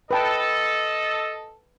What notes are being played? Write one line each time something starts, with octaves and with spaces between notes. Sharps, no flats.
A4 B4 D#5 G5 A5